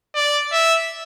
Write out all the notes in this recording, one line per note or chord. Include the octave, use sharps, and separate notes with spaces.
D5
E5